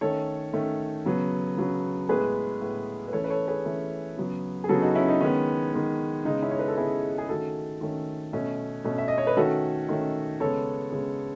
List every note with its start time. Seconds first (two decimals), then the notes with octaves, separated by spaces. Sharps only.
0.01 D#3 A3 C#4 A4 C#5
0.53 D#3 A3 C#4
1.05 C#3 F#3 B3
1.57 C#3 F#3 B3
2.09 A2 G#3 B3 G#4 B4
2.61 A2 G#3 B3
3.08 B4
3.13 E3 A3 C#4 A4 C#5
3.24 B4
3.30 A4 C#5
3.48 G#4 B4
3.65 E3 A3 C#4
4.17 C#3 F#3 B3
4.64 G#4
4.69 C#3 F#3 B3 F#4 A4
4.82 D#4 F#4
4.95 C#4 E4
5.08 D#4
5.21 D#3 G#3 B3 C#4
5.73 D#3 G#3 B3
6.25 C#3 G#3 B3 D#4
6.42 C#4 E4
6.51 C#5
6.59 B4
6.68 A4
6.77 C#3 G#3 B3 E4 G#4
7.18 G#4
7.29 D#3 A3 C#4 F#4 A4
7.81 D#3 A3 C#4
8.33 B2 A3 C#4
8.84 B2 A3 C#4
8.98 E5
9.08 D#5
9.18 C#5
9.27 B4
9.37 D#3 A3 C#4 F#4 A4
9.89 D#3 A3 C#4
10.40 C#3 G#3 B3 A4 C#5
10.92 C#3 G#3 B3